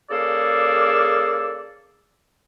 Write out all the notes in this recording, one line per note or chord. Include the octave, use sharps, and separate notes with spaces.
C#3 A#3 G#4 A4 D5 E6